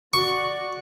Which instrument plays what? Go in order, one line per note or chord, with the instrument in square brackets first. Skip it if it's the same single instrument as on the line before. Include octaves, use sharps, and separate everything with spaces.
[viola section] F#4 D5 [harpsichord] C#6